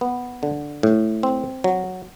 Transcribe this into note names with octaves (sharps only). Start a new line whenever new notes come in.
B3
D3
A2
C4
F#3